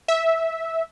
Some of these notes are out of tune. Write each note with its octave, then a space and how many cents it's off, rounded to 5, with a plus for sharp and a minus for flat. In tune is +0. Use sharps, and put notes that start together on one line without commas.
E5 -10